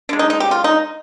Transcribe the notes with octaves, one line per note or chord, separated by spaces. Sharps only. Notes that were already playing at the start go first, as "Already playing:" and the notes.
D3 G#3 D4
D#4
D#4
G4
F4
D#4